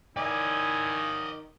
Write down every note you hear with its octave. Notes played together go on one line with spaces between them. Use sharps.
D#3 E4 D5 D#5 G#5